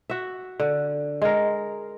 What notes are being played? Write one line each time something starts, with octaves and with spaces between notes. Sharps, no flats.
F#4 E5
D3
G#3 A#4